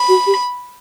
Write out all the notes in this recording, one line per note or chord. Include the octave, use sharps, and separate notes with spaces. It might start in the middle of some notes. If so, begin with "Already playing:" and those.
Already playing: B5
F#4
G4